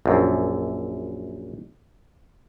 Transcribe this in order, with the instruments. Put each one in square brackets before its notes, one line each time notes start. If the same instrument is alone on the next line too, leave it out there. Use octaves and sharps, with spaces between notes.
[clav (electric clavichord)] A#1 F#2